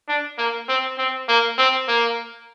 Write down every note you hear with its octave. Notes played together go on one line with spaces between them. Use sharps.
D4
A#3
C4
C4
A#3
C4
A#3